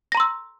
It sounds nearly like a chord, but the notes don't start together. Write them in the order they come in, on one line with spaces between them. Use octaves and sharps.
A#6 A#5 C6 E6